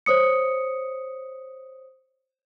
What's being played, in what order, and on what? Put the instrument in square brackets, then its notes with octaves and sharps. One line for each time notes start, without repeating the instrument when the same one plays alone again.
[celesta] C5 C#5 D#6 C#7